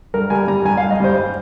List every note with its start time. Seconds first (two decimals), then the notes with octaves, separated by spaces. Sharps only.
0.14 G2 A#4
0.30 G3 G#5
0.48 G3 A#5
0.65 G2 G#5
0.77 F5
0.83 G2
0.91 D#5
1.00 G3 C5